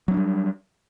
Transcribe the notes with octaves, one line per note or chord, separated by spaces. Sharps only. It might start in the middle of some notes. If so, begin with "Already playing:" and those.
F#3 G3 C#4 D4